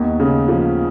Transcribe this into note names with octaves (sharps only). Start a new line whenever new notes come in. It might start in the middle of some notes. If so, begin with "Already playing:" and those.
Already playing: D#2 B3 D#4
C#3
F3